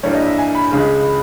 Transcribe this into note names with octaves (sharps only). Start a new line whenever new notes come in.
G2 E3 G3 A#3 C#5
D#5
E5
G#5
B5
C#2 C#3 G#3